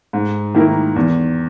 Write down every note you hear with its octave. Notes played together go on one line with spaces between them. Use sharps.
G#2
D#3 A#3 E4 A#4
E2